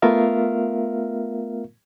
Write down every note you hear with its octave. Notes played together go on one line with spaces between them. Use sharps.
A3 B3 F4 A#4 E5 F5